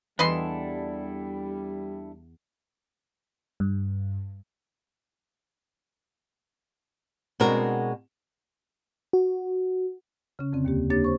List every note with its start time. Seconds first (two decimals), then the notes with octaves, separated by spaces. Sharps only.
0.19 E2 G3 D4 E4 A4 B4 D#5 C6
3.60 G2
7.40 B2 G#3 C4 D4 F#4 A#4
9.13 F#4
10.39 C#3 C#4
10.52 F2 D3 C4
10.65 D#2 A#3 G4
10.90 A#3 D4 G4 C#5 A6
11.04 C5 C#6